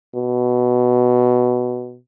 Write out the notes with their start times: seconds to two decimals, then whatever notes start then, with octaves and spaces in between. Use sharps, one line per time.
0.16 B2